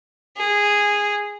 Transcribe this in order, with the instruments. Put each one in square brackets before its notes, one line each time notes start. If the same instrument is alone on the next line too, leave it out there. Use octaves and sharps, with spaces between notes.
[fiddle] G#4